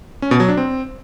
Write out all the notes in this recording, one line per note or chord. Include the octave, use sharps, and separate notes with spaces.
C#4
B2
F#3
D4
C4